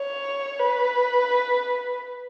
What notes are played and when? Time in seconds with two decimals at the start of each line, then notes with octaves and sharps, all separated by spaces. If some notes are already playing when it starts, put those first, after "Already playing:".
Already playing: C#5
0.59 B4